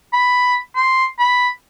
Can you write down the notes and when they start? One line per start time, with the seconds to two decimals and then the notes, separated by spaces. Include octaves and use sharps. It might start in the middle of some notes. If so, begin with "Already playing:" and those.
0.13 B5
0.76 C6
1.19 B5